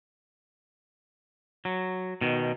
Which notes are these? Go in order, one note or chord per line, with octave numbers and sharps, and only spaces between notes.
F#3
B2 D#3